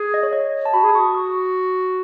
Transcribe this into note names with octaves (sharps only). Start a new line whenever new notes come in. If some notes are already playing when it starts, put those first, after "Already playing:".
Already playing: G#4
D#5
C#5
D#5
A5
F#4 B5
G#4
D#6
F#4 C#6
D#6